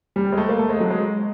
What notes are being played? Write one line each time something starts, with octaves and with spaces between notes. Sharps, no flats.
G3
G#3
A3
A#3
A3
G#3
F#3
G#3